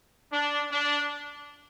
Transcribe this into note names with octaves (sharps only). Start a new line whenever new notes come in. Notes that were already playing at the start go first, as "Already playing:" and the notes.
D4
D4